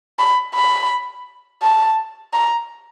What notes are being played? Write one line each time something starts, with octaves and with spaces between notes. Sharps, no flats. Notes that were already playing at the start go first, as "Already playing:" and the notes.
B5
B5
A5
A#5